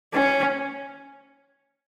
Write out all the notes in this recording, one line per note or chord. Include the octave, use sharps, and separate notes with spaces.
C#4